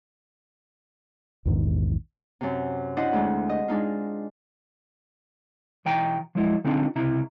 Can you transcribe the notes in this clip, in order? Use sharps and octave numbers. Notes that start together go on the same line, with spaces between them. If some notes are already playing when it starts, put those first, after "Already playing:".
A#1 E2 G#2 D#3
F#2 C3
D4 E4 C5 D#5 F#5
D2 G#3
D#5
G#3 D4 D#4 F4
B1 E3 G5 A#5
F3 F#3 G#3 E4
D3 C4 D4 D#4 F4
C#2 C3 E4 A#5